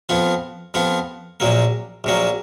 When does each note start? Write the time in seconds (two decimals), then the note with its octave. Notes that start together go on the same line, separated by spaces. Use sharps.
0.09 F2 F3 B3 F4
0.74 F2 F3 B3 F4
1.40 A#1 A#2 F#3 A#3
2.04 A#1 A#2 F#3 A#3